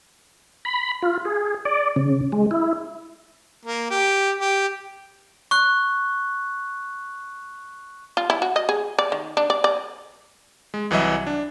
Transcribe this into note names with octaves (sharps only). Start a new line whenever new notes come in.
B5
F4
G#4
D5
C#3
G#3
E4
A#3
G4
G4
C#6 F#6
F4
E4
F#4
D#5
G#4
D5
D#3
D4
D5
D5
G#3
C2 E3 F#3 D#5 E5
D4